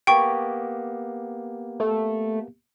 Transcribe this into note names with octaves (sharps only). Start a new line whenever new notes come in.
A#3 B3 G4 G5 C#6
A3